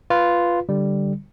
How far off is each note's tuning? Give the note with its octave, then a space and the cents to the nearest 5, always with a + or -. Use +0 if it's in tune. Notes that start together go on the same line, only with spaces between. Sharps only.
F4 -5 B4 +0
D3 +0 G3 +0